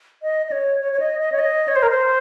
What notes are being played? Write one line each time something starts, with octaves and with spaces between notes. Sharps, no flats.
D#5
D#5
C#5
C#5
C#5
D#5
D#5
C#5
D#5
C#5
C5
A#4
C5